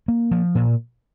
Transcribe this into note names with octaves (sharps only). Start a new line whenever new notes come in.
A#3
F3
A#2